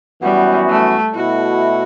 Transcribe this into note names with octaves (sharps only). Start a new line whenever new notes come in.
F#2 E3 G3 B3 F#4
A3
B2 A3 E4 F#4